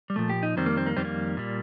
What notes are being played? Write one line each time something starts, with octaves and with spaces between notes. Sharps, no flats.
G3
A#2 F3 A3
G4
D#4
F2 D#3 G3 C4
A#3
C4
A#3
F2 D#3 G3 C4
A#3
A#2 G3